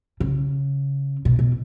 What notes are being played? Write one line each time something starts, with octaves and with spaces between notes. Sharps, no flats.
C#3
B2
B2